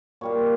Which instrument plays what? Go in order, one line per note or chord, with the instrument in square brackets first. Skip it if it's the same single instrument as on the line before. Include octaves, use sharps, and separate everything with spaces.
[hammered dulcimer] A#2 G3 A#3 C#5